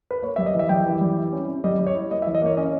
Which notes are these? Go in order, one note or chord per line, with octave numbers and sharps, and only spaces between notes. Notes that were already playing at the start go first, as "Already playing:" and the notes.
B4
A#3 C#5
G3 E5
D#5
E3 E5
G3 G5
E3
G3
E4
C#4
C#4
G3 D#5
G3
C#5
E4
A#3 D#5
E5
E3
D#5
A#3 C#5
C#4 D#5